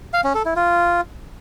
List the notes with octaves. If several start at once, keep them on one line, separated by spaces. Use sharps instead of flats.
F5
C#4
A4
E4
F4